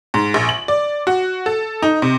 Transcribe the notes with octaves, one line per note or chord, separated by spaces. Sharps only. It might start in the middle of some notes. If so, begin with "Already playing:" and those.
G#2
A#1
F#7
D5
F#4
A4
D#4
C3